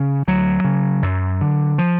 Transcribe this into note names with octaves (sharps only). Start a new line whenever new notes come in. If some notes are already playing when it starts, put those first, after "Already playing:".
Already playing: C#3 C#4
D2 F#3
C#3
F#2
D3
F3